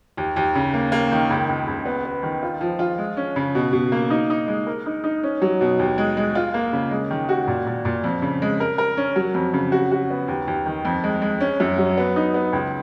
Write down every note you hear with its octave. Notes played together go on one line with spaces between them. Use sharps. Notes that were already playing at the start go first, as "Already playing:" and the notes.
D#2
D#2
C#3
A#3
A#3
D#3
C#2
C#2
C#2
B3
B3
D#3
F4
F3
F4
G#3
C#4
C#3
B2
B2
A#3
D#4
D#4
G#3
A#4
D#4
D#4
C#4
F#3
B2
D#2
G#3
G#3
F4
A#3
C#3
G#3
D#3
F#4
A#2
A#2
A#2
F2
C#3
G#3
A#4
A#4
C#4
F#3
F2
C#3
F#4
F#4
B3
D#2
D#2
D#3
F2
G#3
G#3
C#4
F#2
F#3
B3
D#4
B3
C#2